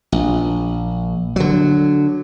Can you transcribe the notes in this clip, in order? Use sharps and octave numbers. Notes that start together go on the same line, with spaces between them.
A#1
D3 F#3